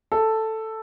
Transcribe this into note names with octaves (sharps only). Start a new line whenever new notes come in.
A4